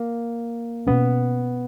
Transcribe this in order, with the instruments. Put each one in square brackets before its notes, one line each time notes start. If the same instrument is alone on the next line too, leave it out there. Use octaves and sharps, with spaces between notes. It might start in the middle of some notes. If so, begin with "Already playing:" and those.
Already playing: [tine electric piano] A#3
[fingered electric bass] B2 A#3 C#4 [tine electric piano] B3